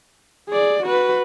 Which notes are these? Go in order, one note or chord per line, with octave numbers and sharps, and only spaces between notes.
G#4 D5
F#4 B4